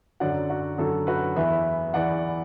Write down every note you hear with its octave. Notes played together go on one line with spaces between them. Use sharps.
F#2 D3 F#3 D5 F#5
F#4
F#2 D3 F#3 A4
F#4 B4
E2 E3 B4 E5
E2 E3 D5 F#5